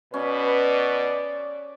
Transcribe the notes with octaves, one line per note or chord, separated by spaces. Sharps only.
B2 C#4 B4 D5